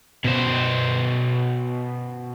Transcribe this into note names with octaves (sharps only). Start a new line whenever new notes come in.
B2 C5